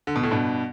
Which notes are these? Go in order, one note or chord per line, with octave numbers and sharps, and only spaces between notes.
D3
B2
A2
G2 B2